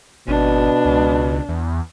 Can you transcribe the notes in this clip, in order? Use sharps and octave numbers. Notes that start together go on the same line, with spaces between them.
G#1 B2 D4
C#2
E2